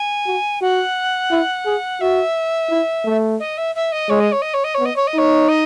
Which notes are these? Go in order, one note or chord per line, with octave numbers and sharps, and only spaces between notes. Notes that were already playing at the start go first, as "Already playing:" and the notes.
Already playing: G#5
F#4
F#4 F#5
E4
G#4
F#4 E5
E4
A3
D#5
E5
E5
D#5
G#3 C#5
D#5
C#5
D#5
C#5
D#5
B3 C#5
D#5
C#5
D#5
D#4 C#5
D#5